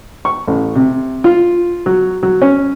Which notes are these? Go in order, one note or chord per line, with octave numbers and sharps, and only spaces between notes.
C#6
A1
C3
F4
F#3
F#3
C#4